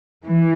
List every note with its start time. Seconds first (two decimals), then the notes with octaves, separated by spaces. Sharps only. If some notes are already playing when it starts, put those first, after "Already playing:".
0.25 E3